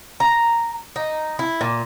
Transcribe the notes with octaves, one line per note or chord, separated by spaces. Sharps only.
A#5
D#4
E4
A#2